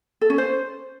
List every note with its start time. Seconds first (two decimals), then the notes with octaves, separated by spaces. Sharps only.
0.21 A4
0.30 C#4
0.38 C5